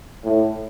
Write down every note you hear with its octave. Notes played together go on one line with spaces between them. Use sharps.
A2